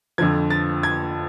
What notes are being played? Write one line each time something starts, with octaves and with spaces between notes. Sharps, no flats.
F2 D3 F3 G#6
A6
G#6